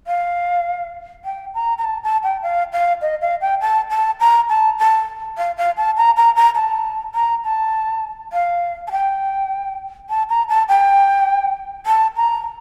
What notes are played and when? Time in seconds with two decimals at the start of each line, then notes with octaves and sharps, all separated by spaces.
0.07 F5
1.25 G5
1.54 A#5
1.78 A#5
1.84 A5
2.04 A5
2.23 G5
2.43 F5
2.73 F5
3.02 D#5
3.22 F5
3.41 G5
3.61 A5
3.90 A5
4.20 A#5
4.49 A5
4.79 A5
5.38 F5
5.57 F5
5.77 A5
5.97 A#5
6.17 A#5
6.36 A#5
6.55 A5
7.14 A#5
7.44 A5
8.33 F5
8.87 A5
8.92 G5
10.09 A5
10.29 A#5
10.49 A5
10.68 G5
11.86 A5
12.16 A#5